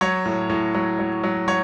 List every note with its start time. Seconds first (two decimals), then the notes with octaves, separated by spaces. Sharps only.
0.01 F#3 C#5
0.25 A2
0.50 A2
0.75 F#3
0.99 F#3
1.24 F#3
1.48 F#3 C#5